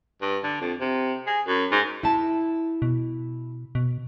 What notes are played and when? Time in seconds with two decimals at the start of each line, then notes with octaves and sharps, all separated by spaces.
0.21 G2
0.44 D3
0.61 F2
0.80 C3
1.27 G#4
1.47 F#2
1.71 G#2
2.03 E4 A5
2.82 B2
3.75 B2